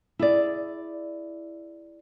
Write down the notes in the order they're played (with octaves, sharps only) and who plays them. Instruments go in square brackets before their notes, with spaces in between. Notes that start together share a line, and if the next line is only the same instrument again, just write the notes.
[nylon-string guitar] E4 G#4 D5